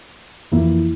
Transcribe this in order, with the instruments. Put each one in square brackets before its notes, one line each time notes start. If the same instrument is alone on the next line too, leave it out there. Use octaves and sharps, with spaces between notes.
[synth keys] F2 E3 A#3 E4